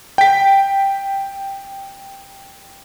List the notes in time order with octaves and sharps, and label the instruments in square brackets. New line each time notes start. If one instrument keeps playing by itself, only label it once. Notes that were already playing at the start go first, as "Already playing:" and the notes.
[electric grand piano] G5 B6